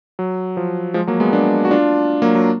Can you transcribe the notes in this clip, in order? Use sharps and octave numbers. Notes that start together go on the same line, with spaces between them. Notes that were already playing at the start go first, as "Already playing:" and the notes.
F#3
F3
F3 G#3
F#3 A#3
G#3 B3
A#3 D4
F#4
D4 F4
F#3 A#3
F#3